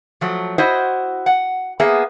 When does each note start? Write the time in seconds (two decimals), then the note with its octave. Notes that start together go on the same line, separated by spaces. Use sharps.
0.21 F3 F#3 A3
0.58 E4 F#4 C5 D#5
1.26 F#5
1.80 A#3 B3 G#4 E5